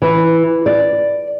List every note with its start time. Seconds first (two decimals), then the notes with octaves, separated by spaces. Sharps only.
0.02 E3
0.66 D5